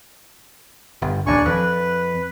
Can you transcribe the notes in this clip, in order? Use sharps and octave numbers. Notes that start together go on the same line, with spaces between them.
G1
D#1 D#2 D4 G#5 C#6
F2 B4